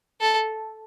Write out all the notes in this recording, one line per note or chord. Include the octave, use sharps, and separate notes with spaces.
A4